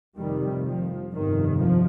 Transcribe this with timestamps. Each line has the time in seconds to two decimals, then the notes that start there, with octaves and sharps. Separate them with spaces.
0.18 F1 F2 C3 D#3 G3
0.65 F3
1.12 G1 F2 C3 D#3
1.58 F3